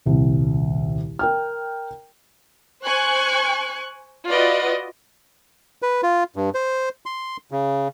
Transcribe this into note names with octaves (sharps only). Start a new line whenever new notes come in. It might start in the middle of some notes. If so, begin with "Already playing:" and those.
D#1 C2
A#4 G5 F6
C5 G#5 C#6 F#6
F4 F#4 B4 D5 D#5
B4
F4
G2
C5
C6
C#3